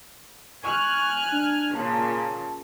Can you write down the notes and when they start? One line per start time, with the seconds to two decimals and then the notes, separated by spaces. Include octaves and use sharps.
0.64 G#5 C#6 F6 F#6
1.32 D4
1.75 A#2 C#3 A5